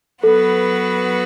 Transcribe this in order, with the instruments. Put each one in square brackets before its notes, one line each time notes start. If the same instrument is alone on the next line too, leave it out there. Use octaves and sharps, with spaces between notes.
[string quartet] F#3 B3 F#4 B4 [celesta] A4